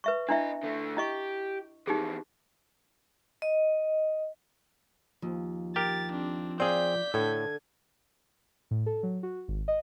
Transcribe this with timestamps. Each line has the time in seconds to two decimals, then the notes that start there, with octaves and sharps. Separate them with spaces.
0.04 B4 E5 C#6
0.29 C4 D4 E4 D#5 E5
0.63 D3 A3
0.97 E4 G4 D#5 C#6
1.87 F2 E3 D#4 G4 G#4
3.42 D#5
5.22 D#2 F3
5.76 G4 A#4 A6
6.11 C4 D4
6.60 C4 G#4 D5 F5 G6 B6
7.14 A2 D3 A4 G#6
8.71 A2
8.86 A4
9.03 F#3
9.23 F#4
9.48 G#1
9.68 D#5